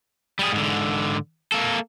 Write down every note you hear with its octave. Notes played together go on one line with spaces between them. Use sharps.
G3 G#4
G#2 D3
A#3 A4